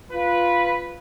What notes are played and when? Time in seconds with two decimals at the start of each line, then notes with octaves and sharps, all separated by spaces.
0.12 F4 B4